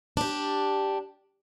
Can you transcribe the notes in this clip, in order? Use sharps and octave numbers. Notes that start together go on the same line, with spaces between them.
D4 G4